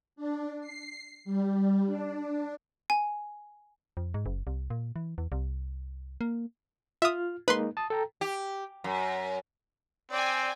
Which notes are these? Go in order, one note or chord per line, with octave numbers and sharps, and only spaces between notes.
D4
C7
G3
D4
G#5
F2
G#2
F#1
C2
A#2
E3
E2
C2
A#3
F4 E5 D#6 F6
G#3 A#3 D#4 B4 C6
A5 D#6
A4 G5 A#5
G4
F#2
C4 D5 G5 G#5